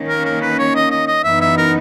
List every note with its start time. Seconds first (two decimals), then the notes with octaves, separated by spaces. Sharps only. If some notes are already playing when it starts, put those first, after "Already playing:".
Already playing: D#3 A#3 C#4
0.08 A#4
0.25 A#4
0.42 B4
0.59 C#5
0.75 D#5
0.91 D#5
1.07 D#5
1.24 F#2 E3 B3 D#4 E5
1.41 E5
1.57 A#4